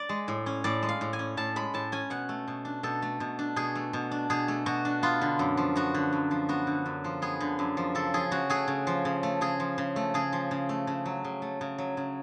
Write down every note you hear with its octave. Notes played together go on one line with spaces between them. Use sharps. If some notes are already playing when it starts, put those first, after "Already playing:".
Already playing: D5
G#3
A2
C#4
A2 D5
G#3
F5
A2
G#5
C#4
A2 A5
G#3 B5
A2 A5
C#4 G#5
B2 F#5
A3
B2
D4
B2 A4
A3
B2
D4
B2 G#4
A3
B2
D4
B2 G#4
A3
B2 F#4
D4
B3 F4
D3
F#2
F3
B3 F#4
D3
F#2
F3
B3 F#4
D3
F#2
F3
B3 G#4
D3
F#2
F3
C#3 A4
F3 G#4
C#3 F#4
A3 G#4
C#3
F3
C#3
A3
C#3 G#4
F3
C#3
A3
C#3 G#4
F3
C#3
A3
C#3
F#3
C#3
A3
C#3
F#3
C#3